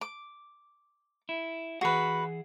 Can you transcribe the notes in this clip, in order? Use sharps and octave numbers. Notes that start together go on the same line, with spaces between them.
D6
E4
E3 F#4 G#4 B4 F#5